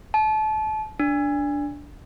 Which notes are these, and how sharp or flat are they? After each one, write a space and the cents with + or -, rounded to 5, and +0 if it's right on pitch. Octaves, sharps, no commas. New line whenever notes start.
A5 -30
D4 -10